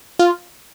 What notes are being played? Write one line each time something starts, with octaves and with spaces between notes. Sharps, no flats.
F4